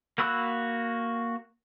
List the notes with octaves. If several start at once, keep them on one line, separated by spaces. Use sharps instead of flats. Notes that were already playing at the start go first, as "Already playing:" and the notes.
A#3 F#4 B5 E6 F#6